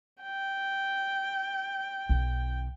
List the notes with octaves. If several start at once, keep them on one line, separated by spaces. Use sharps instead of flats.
G5
B1 D#3